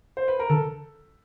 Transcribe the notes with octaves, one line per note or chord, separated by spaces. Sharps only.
C5
B4
A#4
D3 A4